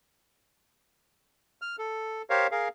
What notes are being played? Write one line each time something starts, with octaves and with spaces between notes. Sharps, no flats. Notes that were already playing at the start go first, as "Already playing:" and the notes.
F6
A4
G4 A#4 C5 C#5 F5
G#4 A#4 F5